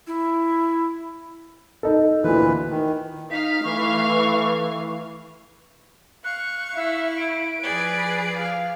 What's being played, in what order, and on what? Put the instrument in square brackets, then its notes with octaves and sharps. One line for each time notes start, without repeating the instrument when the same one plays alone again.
[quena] E4
[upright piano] D#4 A4
[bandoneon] D2 A#2 B4 [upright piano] E3
[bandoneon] D#3
[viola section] D#4 [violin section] F5 [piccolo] B6
[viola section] E3 [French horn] A3 [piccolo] C#6
[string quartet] F5 C#6 [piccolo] F#6
[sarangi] E4 [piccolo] E5
[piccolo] D7
[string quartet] F3 G#4 D5 [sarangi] B4
[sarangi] F5